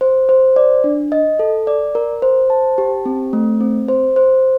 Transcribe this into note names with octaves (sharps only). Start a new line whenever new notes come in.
C5
C5
D5
D4
D#5
A4
D5
A#4
C5
A5
G4
C4
A3
C4
C5
C5